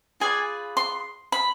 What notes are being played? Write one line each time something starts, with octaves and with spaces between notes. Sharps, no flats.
F4 G#4 B4 D5 G#5
C6
B5